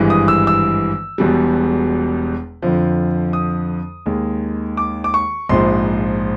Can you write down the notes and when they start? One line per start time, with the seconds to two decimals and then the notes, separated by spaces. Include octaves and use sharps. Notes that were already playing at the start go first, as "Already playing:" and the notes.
Already playing: G#1 G2 E3 G#3
0.10 D#6
0.28 E6
0.47 E6
1.18 E1 E2 B2 G3
2.62 F2 D3 F3
3.33 D#6
4.06 D#2 D#3 G#3
4.77 D6
5.04 D6
5.14 C#6
5.49 A#1 G#2 F3 C6